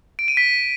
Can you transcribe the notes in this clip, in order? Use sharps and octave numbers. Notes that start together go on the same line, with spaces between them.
D7
D#7
B6